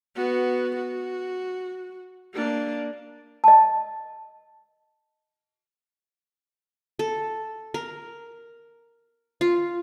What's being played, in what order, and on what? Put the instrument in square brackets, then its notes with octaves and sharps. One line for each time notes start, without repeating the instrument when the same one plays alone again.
[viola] B3 F#4
F#4
A#3 D4
[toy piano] D#5 A5
[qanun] A4
A#4
F4